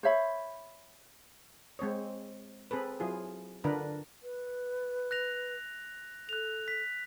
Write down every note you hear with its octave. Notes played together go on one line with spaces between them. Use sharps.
C5 C#5 E5 B5
G#3 C4 C5 C#5
C4 G#4 A4 B4
F#3 E4 F4 G#4
D3 D4 F4 A#4 B4
B4
F#6 A#6 F7
A4 F#6 F7
B6